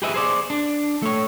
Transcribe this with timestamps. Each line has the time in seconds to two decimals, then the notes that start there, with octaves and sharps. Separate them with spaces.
0.02 G4 G#4 B4 D#5 E5
0.14 G#4 C5 D5
0.50 D4
1.02 A3 C#5